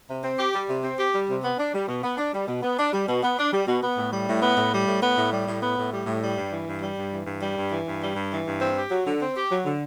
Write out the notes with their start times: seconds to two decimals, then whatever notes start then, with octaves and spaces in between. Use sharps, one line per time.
0.09 C3
0.23 C4
0.38 G4
0.53 G3
0.68 C3
0.83 C4
0.98 G4
1.13 G3
1.29 C3
1.43 B3
1.58 D4
1.73 G3
1.88 B2
2.03 B3
2.17 D4
2.33 G3
2.47 B2
2.62 B3
2.78 D4
2.92 G3
3.07 B2
3.23 B3
3.38 D4
3.52 G3
3.67 B2
3.82 B3
3.97 A2
4.12 G3
4.27 A2
4.42 B3
4.57 A2
4.72 G3
4.87 A2
5.02 B3
5.17 A2
5.32 G3
5.47 A2
5.62 B3
5.77 A2
5.91 G3
6.06 A2
6.22 G3
6.37 G2
6.51 E3
6.67 G2
6.81 G3
6.97 G2
7.11 E3
7.26 G2
7.41 G3
7.56 G2
7.70 E3
7.85 G2
8.01 G3
8.15 G2
8.31 E3
8.46 G2
8.61 C4
8.76 G4
8.90 F#3
9.06 D3
9.20 C4
9.35 G4
9.50 F#3
9.65 D3